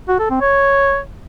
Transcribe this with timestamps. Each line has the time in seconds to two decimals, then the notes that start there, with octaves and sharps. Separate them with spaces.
0.08 F#4
0.19 A4
0.30 C4
0.41 C#5